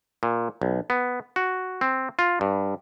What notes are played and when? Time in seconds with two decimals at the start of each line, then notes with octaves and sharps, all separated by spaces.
0.23 A#2
0.62 B1
0.90 B3
1.36 F#4
1.81 C4
2.19 F4
2.41 G2